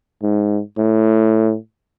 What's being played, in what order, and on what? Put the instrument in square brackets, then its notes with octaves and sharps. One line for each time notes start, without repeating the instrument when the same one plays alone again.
[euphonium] G#2
A2